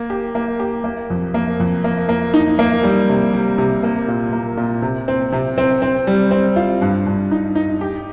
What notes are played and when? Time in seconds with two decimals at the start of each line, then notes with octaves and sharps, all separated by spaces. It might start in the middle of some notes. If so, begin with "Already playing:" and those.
Already playing: A#3
0.10 G4
0.35 A#3
0.60 G4
0.84 A#3
1.10 F2
1.34 A#3
1.60 F2
1.84 A#3
2.09 A#3
2.34 D#4
2.59 A#3
2.83 G3
3.09 C3
3.34 G3
3.58 C3
3.83 A#3
4.08 A#2
4.33 A#3
4.57 A#2
4.82 C3
5.08 C4
5.32 C3
5.58 C4
5.82 C4
6.07 G3
6.31 C4
6.56 F4
6.82 G2
7.07 G2
7.31 D#4
7.55 D#4
7.81 G4